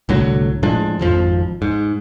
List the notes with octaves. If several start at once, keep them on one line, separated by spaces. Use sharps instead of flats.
C2 A2 D3 F#3
A2 F3 G#3 D4
G#1 F2 F3
G#2